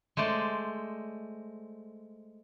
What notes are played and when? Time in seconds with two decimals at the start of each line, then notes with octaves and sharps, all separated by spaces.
0.17 G#3 A3 C5 D5